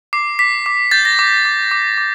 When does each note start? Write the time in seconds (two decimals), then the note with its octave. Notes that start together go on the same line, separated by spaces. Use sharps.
0.13 D6 C7
0.39 D6 B6
0.66 D6
0.91 G6 A6
1.05 A#6
1.19 D6
1.45 D6
1.71 D6
1.98 D6